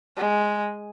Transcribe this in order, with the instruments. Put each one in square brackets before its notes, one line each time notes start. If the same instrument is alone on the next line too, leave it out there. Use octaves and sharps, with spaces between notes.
[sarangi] G#3